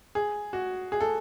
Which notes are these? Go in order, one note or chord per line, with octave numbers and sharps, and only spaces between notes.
G#4
F#4
G#4
A4